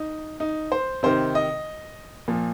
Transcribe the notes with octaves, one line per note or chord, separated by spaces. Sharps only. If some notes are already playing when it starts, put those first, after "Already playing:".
Already playing: D#4
D#4
C5
C3 D#3 C5
D#5
A#2 F3